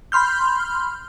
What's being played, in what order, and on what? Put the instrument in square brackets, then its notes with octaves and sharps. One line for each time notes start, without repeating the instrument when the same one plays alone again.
[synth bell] B5 C6 F6 G6